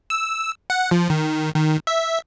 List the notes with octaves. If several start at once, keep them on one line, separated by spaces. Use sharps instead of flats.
E6
F#5
F3
D#3
D#3
E5